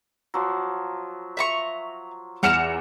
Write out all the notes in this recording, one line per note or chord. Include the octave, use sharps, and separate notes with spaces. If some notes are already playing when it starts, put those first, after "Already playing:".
F3 F#3
E5 A#5 C#6
E2 F#5 A#5 F6 C#7 E7